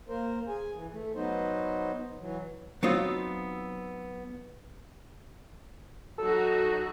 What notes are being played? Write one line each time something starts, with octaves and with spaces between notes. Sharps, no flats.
A#3 A#4 C5
G#4 G#5
E3
A3
F#3 B3 D#4 C5
E3 F#3
F#3 B3 C4 D#4 F4
F#3 D#4 F#4 A4